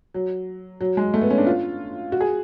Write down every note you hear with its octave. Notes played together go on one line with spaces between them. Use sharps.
F#3
F#3
G#3
A3
B3
C#4
D4
F4
F#4
G#4